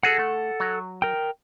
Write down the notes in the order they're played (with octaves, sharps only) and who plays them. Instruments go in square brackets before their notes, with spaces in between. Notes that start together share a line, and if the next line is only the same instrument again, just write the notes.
[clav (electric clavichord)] F#4 G#4 [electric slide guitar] A4 F#5
[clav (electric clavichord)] A3
F#3
[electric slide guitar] A#4 G5